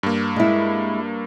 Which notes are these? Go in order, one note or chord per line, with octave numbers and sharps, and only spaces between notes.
G2 A#3
G#3 E4